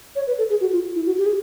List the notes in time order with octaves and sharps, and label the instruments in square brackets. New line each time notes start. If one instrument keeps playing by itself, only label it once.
[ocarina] C#5
B4
A4
G#4
F#4
F4
E4
F#4
G4
G#4